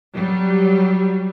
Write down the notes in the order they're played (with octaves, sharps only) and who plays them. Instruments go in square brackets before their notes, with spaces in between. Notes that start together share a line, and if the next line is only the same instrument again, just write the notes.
[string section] F#3 G3